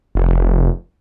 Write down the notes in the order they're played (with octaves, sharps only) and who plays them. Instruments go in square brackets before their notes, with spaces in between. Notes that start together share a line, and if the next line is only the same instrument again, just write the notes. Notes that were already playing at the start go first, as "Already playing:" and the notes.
[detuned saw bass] F1